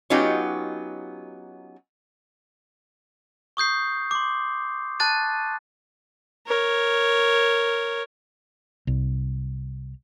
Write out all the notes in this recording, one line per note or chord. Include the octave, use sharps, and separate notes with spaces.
F#3 B3 C#4 D#4 F4 G4
C#6 D#6 G6 C7
C6 D6
A5 F#6 A6 D#7
A#4 C#5
C2